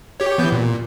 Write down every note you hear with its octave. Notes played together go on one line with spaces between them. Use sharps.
G4 C#5
E3 B3 G6
A#2